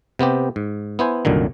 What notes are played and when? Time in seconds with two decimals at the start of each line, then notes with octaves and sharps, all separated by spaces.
0.19 C3 B3 C4 G4
0.56 G#2
0.99 B3 E4 C5 G#5
1.25 C2 F#2 A#2 D3 D#3